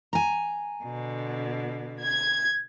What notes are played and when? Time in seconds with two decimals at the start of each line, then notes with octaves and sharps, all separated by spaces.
0.13 G#5 A#5
0.84 B2 D3
2.03 G#6